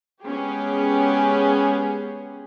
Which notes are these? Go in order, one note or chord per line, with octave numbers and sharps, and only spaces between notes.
G#3 B3 C#4 G4 G#4